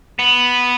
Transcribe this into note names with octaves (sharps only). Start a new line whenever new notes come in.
B3